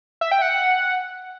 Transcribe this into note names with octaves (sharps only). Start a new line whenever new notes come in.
E5
G5
F#5
F#5